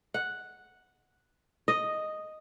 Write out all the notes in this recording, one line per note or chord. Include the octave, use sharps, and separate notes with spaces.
F#5
D#5